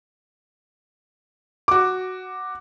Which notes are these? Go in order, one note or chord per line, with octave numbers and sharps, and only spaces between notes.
F#4 D6